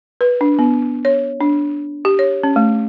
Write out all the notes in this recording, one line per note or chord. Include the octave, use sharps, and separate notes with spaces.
B4
D4
B3
C#5
D4
G4
C#5
C#4
A3